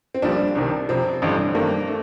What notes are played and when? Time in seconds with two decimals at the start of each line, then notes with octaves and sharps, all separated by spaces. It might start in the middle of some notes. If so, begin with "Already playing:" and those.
0.14 C4
0.22 A#1 A#2 G3 A#3 D4
0.55 C2 C3 D#3
0.89 F2 C3 F3 C4
1.22 A1 G2 D3
1.54 G2 D#3 A3 A#3
1.87 A3